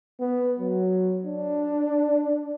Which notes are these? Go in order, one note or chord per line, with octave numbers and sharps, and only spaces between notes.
B3
F#3
D4